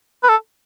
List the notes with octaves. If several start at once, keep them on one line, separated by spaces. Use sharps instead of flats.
B4
A4